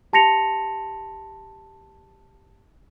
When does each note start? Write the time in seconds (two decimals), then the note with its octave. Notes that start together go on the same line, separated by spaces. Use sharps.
0.13 G4 A5 C6 A#6 C#7 F7